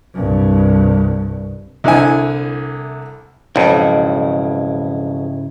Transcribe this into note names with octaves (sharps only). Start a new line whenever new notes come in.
C2 G2
C2 D3 E4 G#5
B1 F2 G#2 C#3 E4